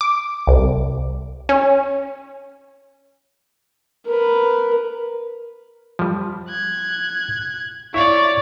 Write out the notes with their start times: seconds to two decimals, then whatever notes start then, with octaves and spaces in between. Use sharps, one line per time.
0.01 D6
0.47 C2
1.49 C#4
4.06 A#4 B4
5.99 F3 G3
6.49 F#6 G#6
7.94 E4 C#5 D5 E5 F5 C#6